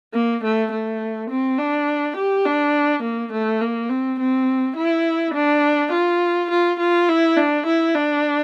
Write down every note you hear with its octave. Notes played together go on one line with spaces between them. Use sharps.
A#3
A3
A3
C4
D4
G4
D4
A#3
A3
A#3
C4
C4
E4
D4
F4
F4
F4
E4
D4
E4
D4